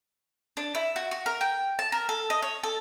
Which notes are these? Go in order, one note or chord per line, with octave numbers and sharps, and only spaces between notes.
D4
E4
F#4
F#4
A#4
G5
A5
A#4
A4
D#5
C#5
A4